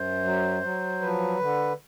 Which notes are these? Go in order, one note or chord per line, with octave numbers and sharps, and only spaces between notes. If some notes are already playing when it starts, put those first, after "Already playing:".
Already playing: F#2 C5
F#3
F#3
F3 B4
D3